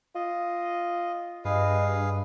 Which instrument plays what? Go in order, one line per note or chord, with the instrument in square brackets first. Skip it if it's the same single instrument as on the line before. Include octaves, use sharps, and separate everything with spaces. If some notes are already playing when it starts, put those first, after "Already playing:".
[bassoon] F4 [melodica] D#5
[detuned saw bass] G2 [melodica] G#4 B4 F5 [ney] D#5